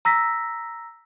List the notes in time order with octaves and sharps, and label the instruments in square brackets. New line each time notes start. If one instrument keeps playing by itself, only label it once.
[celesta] A#5 E6 A#6 B6